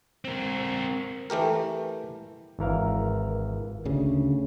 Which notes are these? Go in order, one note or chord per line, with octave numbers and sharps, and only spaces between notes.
C4 A#4
E3 A3 G4 A#4
G#1 E3 A#4 F5
D2 C#3